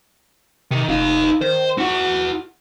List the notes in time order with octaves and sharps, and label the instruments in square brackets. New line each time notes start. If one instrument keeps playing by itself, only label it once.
[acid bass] C3 [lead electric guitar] D#3
[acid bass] F1 [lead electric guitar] D#4 F5
[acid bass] D#3 [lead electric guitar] C5
[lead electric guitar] E4 F#5 [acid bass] F#4